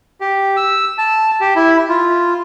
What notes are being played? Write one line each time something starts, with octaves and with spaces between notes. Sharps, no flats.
G4
E6
A5
G4
E4
F4